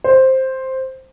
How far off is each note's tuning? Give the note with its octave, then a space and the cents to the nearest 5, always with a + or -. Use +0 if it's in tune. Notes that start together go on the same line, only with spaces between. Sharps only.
C5 +5